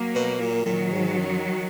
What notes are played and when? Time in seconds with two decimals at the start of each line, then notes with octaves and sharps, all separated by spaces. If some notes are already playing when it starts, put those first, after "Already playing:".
Already playing: F#3 A#3
0.15 B2
0.40 A#2
0.66 A#2 D#3 F#3
0.91 G#2
1.18 F#2